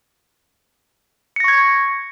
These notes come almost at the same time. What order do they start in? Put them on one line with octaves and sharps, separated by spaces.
C#7 A#6 C#6 G#6